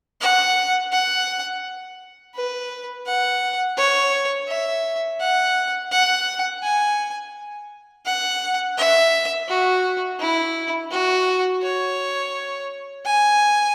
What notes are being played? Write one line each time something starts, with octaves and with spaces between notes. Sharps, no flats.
F#5
F#5
B4
F#5
C#5
E5
F#5
F#5
G#5
F#5
E5
F#4
E4
F#4
C#5
G#5